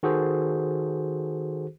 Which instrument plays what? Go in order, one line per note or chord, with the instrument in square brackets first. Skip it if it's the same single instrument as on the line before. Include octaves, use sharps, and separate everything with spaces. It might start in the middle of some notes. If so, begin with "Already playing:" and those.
[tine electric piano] D#3 F#4 G#4 A4 C5